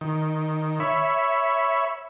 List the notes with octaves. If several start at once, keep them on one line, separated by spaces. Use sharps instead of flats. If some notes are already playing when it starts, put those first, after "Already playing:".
D#3
C#5 E5 B5